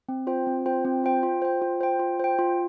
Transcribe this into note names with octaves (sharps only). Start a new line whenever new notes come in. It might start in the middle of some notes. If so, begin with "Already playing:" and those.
C4
F4 C5 G5
C4
F4 C5 G5
C4
F4 C5 G5
F4
C5 G5
F4
C5 G5
F4
C5 G5
F4